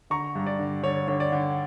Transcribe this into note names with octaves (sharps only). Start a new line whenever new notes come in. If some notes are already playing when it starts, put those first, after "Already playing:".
D3 A#5 C#6
G2
D5
D3
D3 C#5
D3 C#5
D5
D3